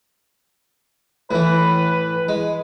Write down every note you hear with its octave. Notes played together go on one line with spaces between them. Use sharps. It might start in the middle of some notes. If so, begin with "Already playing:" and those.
A2 E3 B4
G#3